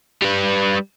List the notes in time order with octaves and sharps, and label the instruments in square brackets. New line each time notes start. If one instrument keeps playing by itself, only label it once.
[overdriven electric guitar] G3 B4